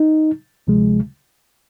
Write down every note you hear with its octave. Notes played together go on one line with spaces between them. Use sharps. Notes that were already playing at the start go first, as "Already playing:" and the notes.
Already playing: D#4
D2 C3 F3 G#3